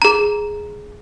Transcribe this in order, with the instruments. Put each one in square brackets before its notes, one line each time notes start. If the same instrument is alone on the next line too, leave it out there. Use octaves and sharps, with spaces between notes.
[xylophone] G#4 A#5